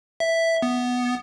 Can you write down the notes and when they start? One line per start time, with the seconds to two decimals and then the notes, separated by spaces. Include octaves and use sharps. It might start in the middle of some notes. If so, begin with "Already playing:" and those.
0.20 E5
0.62 B3